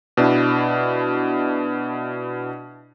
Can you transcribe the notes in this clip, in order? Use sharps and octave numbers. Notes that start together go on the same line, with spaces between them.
B2 D4 E4